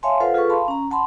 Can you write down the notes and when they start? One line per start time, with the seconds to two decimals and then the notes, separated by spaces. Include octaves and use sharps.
0.03 C#5 E5 F5 G#5 A5 C6
0.20 F4 A4 B4 C5 F5 F#5
0.34 F4 G#4 A4 B4 C#6
0.50 F5 A5 B5 C6
0.68 C#4 A#5
0.91 F#5 A5 B5 C6